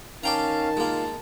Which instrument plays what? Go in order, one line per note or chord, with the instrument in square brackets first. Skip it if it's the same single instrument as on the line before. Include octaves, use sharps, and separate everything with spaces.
[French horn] D#3 [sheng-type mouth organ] C#4 F5 [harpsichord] D5 G5 A#5 [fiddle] A5
[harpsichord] G#3 A#3 [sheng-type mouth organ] F4